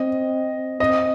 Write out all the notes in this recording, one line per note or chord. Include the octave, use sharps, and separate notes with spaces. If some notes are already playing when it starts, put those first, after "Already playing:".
Already playing: C4 D#5
C4 D#5